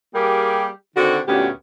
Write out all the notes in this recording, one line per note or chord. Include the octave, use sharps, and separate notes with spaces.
G3 A#3 G4 G#4 A#4
D3 D#3 C4 F#4
D2 A#2 B3 C#4 G4